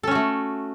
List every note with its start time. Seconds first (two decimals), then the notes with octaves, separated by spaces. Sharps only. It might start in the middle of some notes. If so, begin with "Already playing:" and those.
0.03 A4
0.07 C#4
0.11 F#4
0.15 A3